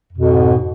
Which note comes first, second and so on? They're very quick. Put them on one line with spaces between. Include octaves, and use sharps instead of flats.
F2 B2 G#2